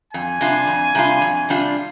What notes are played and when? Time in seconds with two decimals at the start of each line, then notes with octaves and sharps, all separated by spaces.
0.13 F2 G#5
0.41 C3 G3 D4 F4
0.67 F2
0.95 C3 G3 D4 F4
1.22 F2
1.49 C3 G3 D4 F4